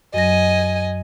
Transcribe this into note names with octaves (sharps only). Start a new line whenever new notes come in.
F#2 F#3 D#5 G#5 A#6